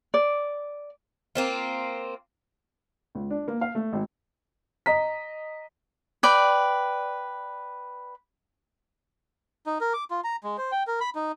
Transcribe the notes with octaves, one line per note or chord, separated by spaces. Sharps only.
D5
A#3 C4 F4
C#2
D4
A#3
F5
A3
G#1
D#5 A#5 B6
B4 D5 G5
D#4
A#4
D6
F4
A#5
G#3
C5
G5
A#4
B5
D#4